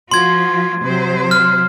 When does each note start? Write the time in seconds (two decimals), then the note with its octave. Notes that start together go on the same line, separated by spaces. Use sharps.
0.11 F3 F4 F#4 C6 G#6
0.83 C3 F#3 C5
1.31 F6